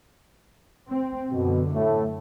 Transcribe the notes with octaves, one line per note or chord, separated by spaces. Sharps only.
C4
F#2 B2 D3
A2 A3